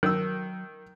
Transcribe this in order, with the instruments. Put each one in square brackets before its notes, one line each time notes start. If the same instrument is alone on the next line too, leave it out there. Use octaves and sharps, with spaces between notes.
[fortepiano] D#3 E6 [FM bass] F#3